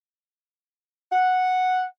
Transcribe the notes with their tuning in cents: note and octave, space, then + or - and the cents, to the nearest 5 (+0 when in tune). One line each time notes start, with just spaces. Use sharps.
F#5 -5